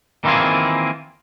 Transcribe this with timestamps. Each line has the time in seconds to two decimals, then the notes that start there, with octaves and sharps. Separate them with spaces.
0.24 D#3 E3 A#3 C4 F4 G#4